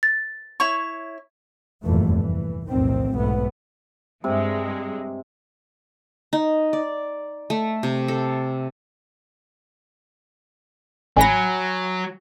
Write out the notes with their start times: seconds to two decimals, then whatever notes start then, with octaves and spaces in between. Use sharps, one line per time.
0.03 A6
0.60 E4 C#5 C#6
1.84 F1 E2 G2 A#2 E3 A3
2.15 E3
2.68 F1 B1 E2 A2 D#3 C4
3.13 B1 G#2 A3 B3
4.24 G2 C3 G#3
6.33 D#4
6.73 D5
7.50 A3
7.83 C3
8.08 A4
11.17 A1 F#3 G#5 B5 A#6